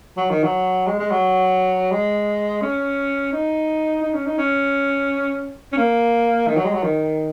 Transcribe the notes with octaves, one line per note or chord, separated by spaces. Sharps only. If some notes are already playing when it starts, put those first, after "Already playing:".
F#3
D#3
F#3
G#3
G#3
F#3
G#3
C#4
D#4
D#4
C#4
D#4
C#4
C#4
A#3
D#3
F#3
G#3
F#3
D#3